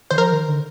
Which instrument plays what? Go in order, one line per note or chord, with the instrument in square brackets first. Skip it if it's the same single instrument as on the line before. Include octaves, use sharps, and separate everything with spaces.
[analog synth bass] D#3 [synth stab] C5
[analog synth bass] F3 [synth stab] A#4
[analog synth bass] D#3
D3